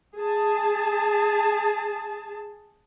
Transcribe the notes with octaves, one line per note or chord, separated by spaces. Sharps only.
G#4 A5